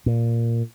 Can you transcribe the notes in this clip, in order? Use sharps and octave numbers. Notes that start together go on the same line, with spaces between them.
A#2